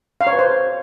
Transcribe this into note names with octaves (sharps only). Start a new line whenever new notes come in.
F5
C#5
B4
C5